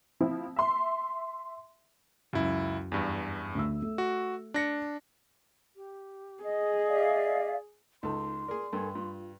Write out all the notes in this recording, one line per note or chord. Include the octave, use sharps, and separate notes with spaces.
F3 C4 E4
E5 C6
C#2 F#2 E4
E2 G2
D2 E6
A3
F#4
D4 A#6 C#7
G4
G#4 D#5
D5 E5 F5
C#2 D#4 A4 C6
G#4 A#4 D5
G2 A4 A#4 G#5
G2 F4